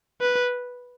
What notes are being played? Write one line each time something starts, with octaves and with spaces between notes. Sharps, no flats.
B4